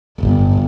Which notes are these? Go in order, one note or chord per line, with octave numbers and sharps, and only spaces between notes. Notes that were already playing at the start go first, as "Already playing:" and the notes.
G1